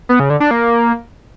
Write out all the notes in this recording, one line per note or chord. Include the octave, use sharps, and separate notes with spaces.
B3
C#3
D3
D4
A#3